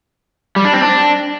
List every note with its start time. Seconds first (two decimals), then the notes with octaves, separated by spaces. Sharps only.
0.56 G3
0.65 D4
0.73 C4
0.82 D4